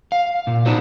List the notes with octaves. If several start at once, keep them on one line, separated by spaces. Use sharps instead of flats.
F5
A#2
B3 D4 D#4 F#4 C5